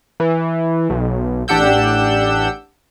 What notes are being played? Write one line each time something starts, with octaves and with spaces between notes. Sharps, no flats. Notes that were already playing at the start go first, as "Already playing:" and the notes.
E3
B1
A1 D4 G4 F#5 E6 G6